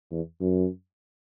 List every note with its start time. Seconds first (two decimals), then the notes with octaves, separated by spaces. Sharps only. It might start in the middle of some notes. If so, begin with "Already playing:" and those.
0.12 E2
0.41 F#2